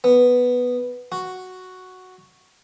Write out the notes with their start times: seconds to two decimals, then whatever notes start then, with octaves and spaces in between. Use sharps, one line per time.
0.04 B3
1.12 F#4